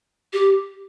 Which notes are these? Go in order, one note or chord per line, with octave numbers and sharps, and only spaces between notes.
G4